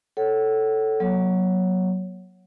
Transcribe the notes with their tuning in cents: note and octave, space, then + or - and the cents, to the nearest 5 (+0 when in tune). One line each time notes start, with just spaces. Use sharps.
A4 +0 C#5 +0 F#5 +35
F#3 +0 A#3 +40 C#5 +0